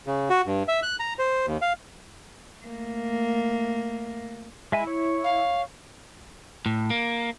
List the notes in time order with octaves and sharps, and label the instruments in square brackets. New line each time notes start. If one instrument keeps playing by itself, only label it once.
[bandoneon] C#3
F#4
G2
E5
F#6
A#5
C5
D#2
F5
[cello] A3 A#3
[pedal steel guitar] G#3 E5 G#5 [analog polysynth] E4
[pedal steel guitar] C#5
[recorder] F5
[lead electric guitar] A2
A#3